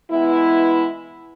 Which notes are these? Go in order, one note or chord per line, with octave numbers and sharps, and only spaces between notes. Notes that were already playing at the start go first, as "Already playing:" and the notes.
E3 G#3 B3 E4